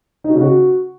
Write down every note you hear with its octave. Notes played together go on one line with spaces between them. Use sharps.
D#4
F#4
C#3
F#4